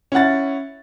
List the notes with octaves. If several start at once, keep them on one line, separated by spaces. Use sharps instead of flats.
C#4 E4 F#5 A6